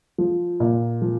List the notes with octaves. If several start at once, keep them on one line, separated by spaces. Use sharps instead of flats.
F3
A#2
F3